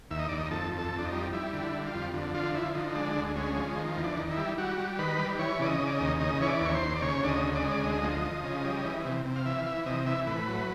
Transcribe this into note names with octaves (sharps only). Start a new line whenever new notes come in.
D#2 E5
D#5
D#2 D5
D#5
F2 A4
F2
A4
F2
D4
D#4
G3
G3 E4
D3
E4
G3
F4
F2
D3
F3 F4
F3 E4
D3 D#4
D#4
G#3 D4
D2
G#3 C#4
F3
D#3
E2
D4
D#3
E4
G3
G3 F#4
G3
D#3 B4
G3
E3 C#5
C#3 D5
D#5
C#3
D5
D#5
D#2
C#3 D#5
E3 C#5
D5
D#2 C#5
C5
D#2
D5
C#3 C#5
D2 D5
D#5
C#3
D5
G#3 D#5
D5
D2 D#5
F3
F3
C#3
G3
E3
C3
C3
F5
E3 E5
F5
E3 E5
C3 D#5
E3 E5
A2 B4
F#3